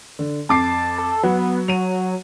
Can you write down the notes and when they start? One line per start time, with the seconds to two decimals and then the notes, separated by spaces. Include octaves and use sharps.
0.19 D3
0.49 F2 A5 D6 C7
0.98 A4
1.23 F#3 B3
1.68 F#3 D#7 F7